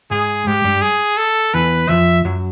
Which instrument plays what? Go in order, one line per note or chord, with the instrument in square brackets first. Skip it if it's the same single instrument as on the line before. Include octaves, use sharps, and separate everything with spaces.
[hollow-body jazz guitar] G#2 G#3 [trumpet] G#4
[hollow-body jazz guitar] G#2 G#3 [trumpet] G4
[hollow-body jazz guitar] G2 G3
[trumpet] G#4
A4
[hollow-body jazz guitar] E2 E3 [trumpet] B4
[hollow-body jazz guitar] F2 F3 [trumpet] E5
[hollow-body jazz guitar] F#2 F#3